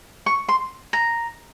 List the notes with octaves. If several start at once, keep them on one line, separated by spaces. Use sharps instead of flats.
C#6
C6
A#5